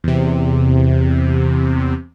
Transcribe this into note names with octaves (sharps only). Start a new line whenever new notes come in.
E2 C3